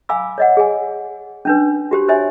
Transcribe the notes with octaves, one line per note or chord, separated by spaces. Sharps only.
F5 G#5 B5 D6 E6
C#5 D#5 F#5
G#4 G#5
C#4 D4 B4
F#4 G4 C5
C5 C#5 E5 G#5